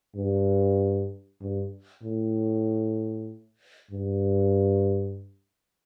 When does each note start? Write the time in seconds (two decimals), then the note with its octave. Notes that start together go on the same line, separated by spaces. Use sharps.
0.16 G2
1.41 G2
2.03 A2
3.91 G2